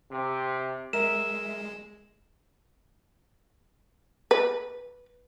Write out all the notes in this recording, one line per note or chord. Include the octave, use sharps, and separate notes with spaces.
C3
G#3 A#4 E5 E7
B4